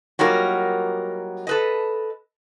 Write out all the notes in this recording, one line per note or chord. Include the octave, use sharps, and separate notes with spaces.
F#3 G3 A#3 D#4 F4 A#4
A4 B4 D#5